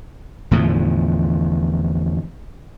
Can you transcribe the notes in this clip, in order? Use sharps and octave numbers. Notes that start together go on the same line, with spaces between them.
E2 A2 D3 F3